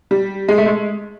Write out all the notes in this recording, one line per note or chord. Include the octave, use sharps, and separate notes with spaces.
G3
G#3
A3
G#3